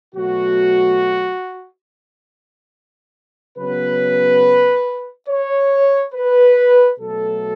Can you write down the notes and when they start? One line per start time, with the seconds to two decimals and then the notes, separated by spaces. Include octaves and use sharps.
0.15 B2 F#3 A3 F#4
3.58 C#3 F#3 B3 B4
5.29 C#5
6.15 B4
7.00 B2 F#3 A3 A4